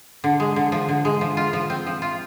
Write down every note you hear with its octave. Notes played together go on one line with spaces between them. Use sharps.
D3
G#3
D3
F3
D3
G#3
F3
F4
F3
C4
F3
F4